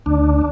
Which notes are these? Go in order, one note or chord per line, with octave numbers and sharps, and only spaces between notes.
D2 D4